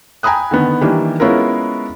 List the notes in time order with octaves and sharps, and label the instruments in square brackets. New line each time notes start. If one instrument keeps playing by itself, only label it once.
[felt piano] G5 G#5 A#5 B5 D#6 F#6
D3 D#3 B3
D#3 E3 G3 A#3 D4
G#3 B3 C#4 E4 F4 A#4